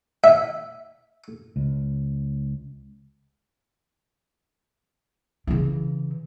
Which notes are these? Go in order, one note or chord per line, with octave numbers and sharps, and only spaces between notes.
E5
C#2
C#3 E3